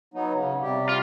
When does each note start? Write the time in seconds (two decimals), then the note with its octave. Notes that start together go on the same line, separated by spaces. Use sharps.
0.14 F#3 B3 D#4
0.34 C#3
0.61 C3 G3 G4
0.89 F4